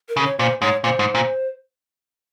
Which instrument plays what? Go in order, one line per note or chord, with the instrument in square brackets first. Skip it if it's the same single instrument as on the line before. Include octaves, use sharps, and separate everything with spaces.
[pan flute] A#4
[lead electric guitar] C#3
[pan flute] C#5
[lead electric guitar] A#2 [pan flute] C5
[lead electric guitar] G#2 [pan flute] C#5
[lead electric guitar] A#2 [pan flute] C5
[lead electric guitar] G#2
A#2